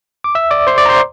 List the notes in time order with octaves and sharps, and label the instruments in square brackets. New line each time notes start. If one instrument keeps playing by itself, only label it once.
[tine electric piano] D6
E5 E6
D5 D6
C5 C6
D5 D6
A#5
C5 C6